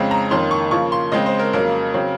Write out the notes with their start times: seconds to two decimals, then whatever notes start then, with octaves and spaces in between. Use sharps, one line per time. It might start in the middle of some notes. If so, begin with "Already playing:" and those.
Already playing: F2 C#3 G#3 C4
0.11 A#5
0.31 F2 D#3 A#3 C#4 C6
0.51 C#6
0.71 C#3 F3 A#3 C#6
0.92 C6
1.12 C#3 G#3 C4 D#5
1.26 C5
1.39 A#4
1.53 F2 C#3 F#3 A#3 A#4
1.94 C#3 F#3 C4